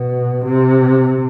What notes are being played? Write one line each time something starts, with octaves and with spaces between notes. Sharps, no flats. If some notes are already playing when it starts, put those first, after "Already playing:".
Already playing: B2
C3